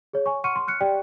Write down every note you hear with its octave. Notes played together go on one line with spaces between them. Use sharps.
G#4 C#5
C#5 G#5 C#6
F#5 C6 C#6 F6 C#7 D#7
C6
F6 F#6 C#7
G4 D5 G5